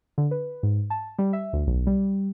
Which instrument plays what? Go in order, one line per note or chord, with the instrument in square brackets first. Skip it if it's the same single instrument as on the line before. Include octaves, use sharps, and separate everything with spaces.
[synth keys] D3
B4
G#2
A5
G3
E5
D2
B1
G3